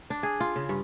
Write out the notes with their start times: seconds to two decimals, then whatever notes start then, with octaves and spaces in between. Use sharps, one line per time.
0.10 D4
0.23 G#4
0.40 F4
0.56 C#3
0.69 G2